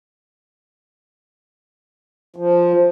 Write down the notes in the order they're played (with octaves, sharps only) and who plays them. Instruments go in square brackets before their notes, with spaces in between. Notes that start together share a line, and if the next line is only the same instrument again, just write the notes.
[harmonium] F3